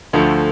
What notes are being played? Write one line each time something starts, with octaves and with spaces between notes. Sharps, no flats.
D2 D3 F3 A3